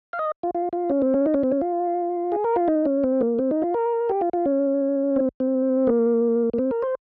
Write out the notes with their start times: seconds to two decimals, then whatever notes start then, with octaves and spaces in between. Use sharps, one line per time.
0.13 F5
0.19 D#5
0.43 F4
0.55 F4
0.73 F4
0.90 C#4
1.02 C4
1.14 C#4
1.26 D#4
1.34 C#4
1.43 C4
1.52 C#4
1.61 F4
2.32 G#4
2.44 A#4
2.56 F4
2.68 D#4
2.85 C#4
3.04 C4
3.21 A#3
3.39 C4
3.51 D#4
3.62 F4
3.74 A#4
4.09 G4
4.21 F4
4.33 F4
4.46 C#4
5.16 C4
5.40 C4
5.87 A#3
6.53 A#3
6.58 C4
6.71 A#4
6.82 C5